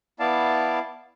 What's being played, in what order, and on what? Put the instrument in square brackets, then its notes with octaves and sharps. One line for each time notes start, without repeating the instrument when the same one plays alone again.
[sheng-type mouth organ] B3 E4 D5 F5 A5